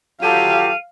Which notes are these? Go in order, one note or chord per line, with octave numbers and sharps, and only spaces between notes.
F#3 F4 G4 A4 F5 D#7